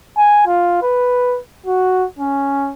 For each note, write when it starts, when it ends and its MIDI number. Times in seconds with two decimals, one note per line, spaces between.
0.17 0.43 80
0.46 0.78 65
0.82 1.38 71
1.66 2.05 66
2.19 2.73 61